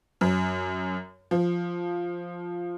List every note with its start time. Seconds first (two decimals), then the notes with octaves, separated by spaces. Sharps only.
0.21 F#2
1.31 F3